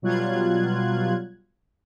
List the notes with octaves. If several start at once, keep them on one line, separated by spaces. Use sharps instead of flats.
B2 F#3 G3 F4 F#6 G#6